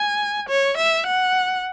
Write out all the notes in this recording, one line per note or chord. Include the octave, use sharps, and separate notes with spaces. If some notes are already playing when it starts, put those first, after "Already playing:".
Already playing: G#5
C#5
E5
F#5